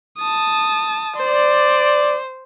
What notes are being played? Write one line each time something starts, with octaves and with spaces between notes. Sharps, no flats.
A5 D#6
C5 D5